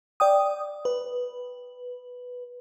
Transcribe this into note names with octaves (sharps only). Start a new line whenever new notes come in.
D5 G5 D#6
B4